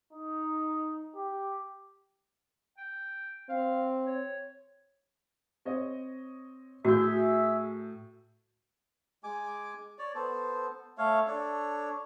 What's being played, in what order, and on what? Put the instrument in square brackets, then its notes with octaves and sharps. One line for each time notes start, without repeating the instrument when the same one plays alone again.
[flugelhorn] D#4
G4
[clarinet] G5
[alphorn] C4 [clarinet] F5
[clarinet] C#5
[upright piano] C4 C#5 D#5
[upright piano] A2 G6 [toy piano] F#4 [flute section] G#4 E5 E6
[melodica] G#3 G#5 D6
C#5 D5
B3 A4 C5
A3 C#5 F5
D4 A4 C#5